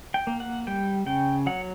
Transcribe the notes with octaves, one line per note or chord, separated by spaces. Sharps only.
G5
A#3
F#5
G3 G5
C#3 G5
F#3 F#5